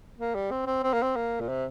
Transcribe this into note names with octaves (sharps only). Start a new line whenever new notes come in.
A#3
G3
C4
C4
C4
A#3
C4
A#3
A#2
C3